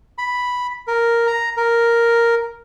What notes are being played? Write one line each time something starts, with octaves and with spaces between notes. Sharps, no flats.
B5
A#4
A#5
A#4